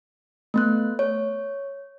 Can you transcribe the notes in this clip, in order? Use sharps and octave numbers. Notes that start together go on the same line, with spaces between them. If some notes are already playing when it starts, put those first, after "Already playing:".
A3 B3 F#6
C#5